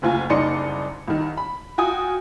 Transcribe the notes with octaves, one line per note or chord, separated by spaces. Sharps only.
F#1 D2 F4 G#5
F#1 C2 D#4 D5 C6 C#7
C2 D#3
B5
F4 F#4 G5 G#5 D#6